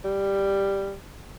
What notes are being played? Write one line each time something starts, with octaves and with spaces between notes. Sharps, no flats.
G3